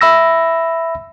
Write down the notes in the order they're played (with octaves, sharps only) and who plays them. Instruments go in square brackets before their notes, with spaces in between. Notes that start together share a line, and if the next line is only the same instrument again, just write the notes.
[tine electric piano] E5 B5 E6 A#6